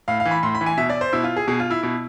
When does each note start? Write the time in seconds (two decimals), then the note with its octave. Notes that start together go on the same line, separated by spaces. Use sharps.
0.08 A2 F5
0.20 F5
0.26 E3
0.31 B5
0.43 A2 C6
0.55 B5
0.61 E3
0.66 G#5
0.78 B2 E5
0.90 D5
1.01 C5
1.13 B2 E4
1.24 F4
1.36 G#4
1.48 B2 G#4
1.60 F4
1.70 E4
1.83 B2 E4